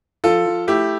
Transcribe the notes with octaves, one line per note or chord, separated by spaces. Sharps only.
F3 F4 A4
F3
A3 E4 G4